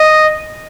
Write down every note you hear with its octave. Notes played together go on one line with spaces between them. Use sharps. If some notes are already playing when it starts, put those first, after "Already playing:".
Already playing: D#5